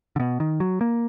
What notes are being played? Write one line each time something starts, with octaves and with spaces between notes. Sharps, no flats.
D3
B2
D#3
F#3
A#3